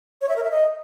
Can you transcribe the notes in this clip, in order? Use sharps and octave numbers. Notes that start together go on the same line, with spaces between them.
C#5
E5
A#4
E5
D#5